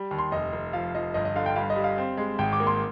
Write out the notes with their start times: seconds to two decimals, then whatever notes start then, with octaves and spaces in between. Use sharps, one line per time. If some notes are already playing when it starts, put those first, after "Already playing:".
Already playing: G3
0.11 D#2
0.18 C6
0.31 F1 D#5
0.53 F1
0.73 F3 F5
0.94 F3 D#5
1.14 G1 D#5
1.25 D#5
1.35 D3 F5
1.46 G5
1.56 G2 F5
1.70 D#5
1.76 G3
1.84 F5
1.98 C4
2.17 G#3
2.38 G#1 G5
2.53 D6
2.60 A#3
2.67 C6